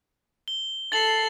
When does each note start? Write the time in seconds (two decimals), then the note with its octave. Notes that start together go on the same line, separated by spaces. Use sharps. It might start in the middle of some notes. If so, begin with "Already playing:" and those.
0.48 G7
0.92 A4 A6 C7 F#7